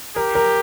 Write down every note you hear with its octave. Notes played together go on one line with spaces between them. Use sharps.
G4 A#4
A#4